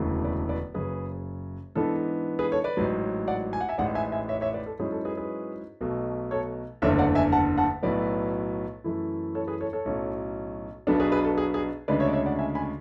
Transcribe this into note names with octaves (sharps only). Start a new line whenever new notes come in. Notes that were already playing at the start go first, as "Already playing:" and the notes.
Already playing: E1 D2 C#3 E3 A3
B4 D5
B4 D5
F#1 F#2 C#3 G#4 B4
G#2 E3 B3 D4 A4
G#4 B4
A4 C#5
B4 D5
A1 G#2 F#3
D5 F#5
G#5
F#5
E5 G#5
A1 G#2 G#3 D5 F#5
E5 G#5
E5 G#5
C#5 E5
C#5 E5
B4 D5
A4
G#2 F#3 C#4 E4 G#4
A4
G#4 B4
G#4 B4
B1 B2 A3
A4 C#5
F#1 E2 D3 A3 D4 C#5 E5
D5 F#5
E5 G#5
F#5 A5
F#5 A5
B1 A2 F#3 B3 B4 D5
F#2 E3 A3 E4
A4 C#5
G#4 B4
A4 C#5
A4 C#5
B1 A2 F#3 C#4
B1 B2 F#3 B3 D4 A4
G#4 B4
G#4 B4
A4
G#4
G#4
D2 C#3 G#3 D4 B4 D5
C#5 E5
D5
C#5 E5
D5 F#5
E5 G#5
G#5 B5